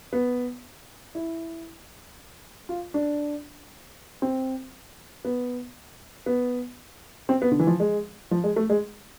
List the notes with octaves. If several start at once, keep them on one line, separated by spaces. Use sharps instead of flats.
B3
E4
F4
D4
C4
B3
B3
C4
B3
D3
E3
F3
G#3
F3
G#3
A3
G#3